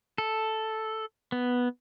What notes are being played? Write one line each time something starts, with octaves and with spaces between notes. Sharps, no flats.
A4
B3